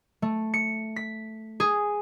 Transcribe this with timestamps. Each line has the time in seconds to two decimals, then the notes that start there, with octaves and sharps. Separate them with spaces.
0.22 A3
0.54 C#7
0.96 B6
1.60 G#4